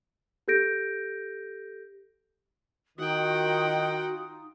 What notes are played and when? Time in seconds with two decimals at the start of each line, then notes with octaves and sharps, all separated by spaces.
0.48 G4 A4 G6 A#6 D7
2.98 D#3 D#4 F4 F#4 F#5 G5 D#6